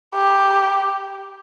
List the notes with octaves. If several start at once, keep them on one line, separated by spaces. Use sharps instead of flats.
G4